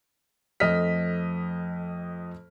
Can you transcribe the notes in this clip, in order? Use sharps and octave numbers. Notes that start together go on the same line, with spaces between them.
F2 A3 D#5 F6 B6